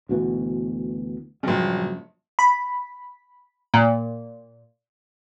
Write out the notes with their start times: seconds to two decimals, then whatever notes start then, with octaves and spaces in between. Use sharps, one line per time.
0.09 D2 B2 E3
1.43 A#1 G2 C#3 F#3
2.39 B5
3.74 A#2